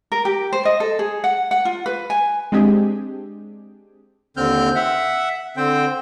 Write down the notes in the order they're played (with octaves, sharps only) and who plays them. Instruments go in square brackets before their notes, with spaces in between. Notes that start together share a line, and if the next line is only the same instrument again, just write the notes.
[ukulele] A#4
G4
C5
D#5
A4
G#4
F#5
F#5
F4
B4
G#5
[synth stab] G#3 C4 D4 G4 G#4
[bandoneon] D#2 D3 C4 F6 G6
E5 F#5
D3 C4 C5 G5